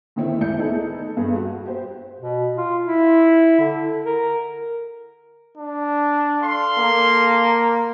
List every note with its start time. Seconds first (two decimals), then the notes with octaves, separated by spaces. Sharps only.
0.16 A2 D3 D#3 A3 C4 E4
0.40 C#2 E4 D5 G6 C#7
0.58 A3 B3 D#4 E4 G#4 A4
1.17 G2 B3 G#4 A4
1.36 F#4
1.66 G4 C5
2.20 B2
2.57 F4
2.87 E4
3.60 D3
4.05 A#4
5.58 D4
6.42 A4 F5 C6
6.79 A#3